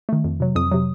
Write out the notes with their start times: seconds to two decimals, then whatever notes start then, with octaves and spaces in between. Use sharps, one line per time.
0.09 D#3 A3
0.24 F2
0.40 C3 F#3
0.55 F2 D#6
0.72 C3 F#3